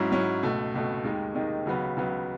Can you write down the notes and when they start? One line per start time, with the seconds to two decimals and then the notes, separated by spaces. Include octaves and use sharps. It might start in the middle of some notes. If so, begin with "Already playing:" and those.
Already playing: G#2 F#3 C#4 E4
0.12 G#2 F#3 C#4 E4
0.43 C#2 B2 A3
0.74 C#2 B2 A3
1.04 D#2 D#3 G#3 D#4
1.35 D#2 D#3 G#3 D#4
1.65 C#2 C#3 F#3 B3
1.96 C#2 C#3 F#3 B3